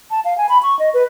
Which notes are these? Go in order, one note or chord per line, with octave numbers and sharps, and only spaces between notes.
A5
F5
G#5
B5
C#6
D#5
B4